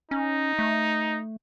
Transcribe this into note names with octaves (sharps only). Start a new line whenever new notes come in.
C#4 D#4
A3